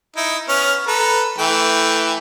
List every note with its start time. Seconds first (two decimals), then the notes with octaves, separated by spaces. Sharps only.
0.16 D#4 E4
0.49 B3 C#4 F6
0.87 A4 B4 A#5
1.38 E3 A3 G5